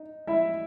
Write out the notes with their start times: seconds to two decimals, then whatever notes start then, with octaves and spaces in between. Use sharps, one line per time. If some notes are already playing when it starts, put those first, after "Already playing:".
Already playing: D#4
0.27 E4 E5